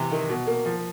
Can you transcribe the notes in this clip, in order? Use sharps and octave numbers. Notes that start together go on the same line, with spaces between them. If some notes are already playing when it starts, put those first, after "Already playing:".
Already playing: C3 E3
D#3
B2
A#3
F3